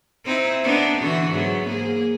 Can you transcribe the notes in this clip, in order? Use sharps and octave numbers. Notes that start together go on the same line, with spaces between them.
C4 D#4 E4
B3 D4 D#4
D3 E3 F#4
G#2 F#3 B3
A#3 G#4